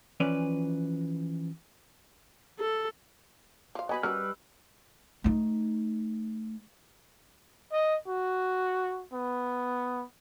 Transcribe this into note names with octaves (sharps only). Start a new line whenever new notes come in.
E3 F3 C#4 B4 D5
A4
F3 F5
F#3 B3 B4 D#5 G#5 B5
G3 C#4 F#4 A#4 B4 E6 F6
A3 D#4
D#5
F#4
B3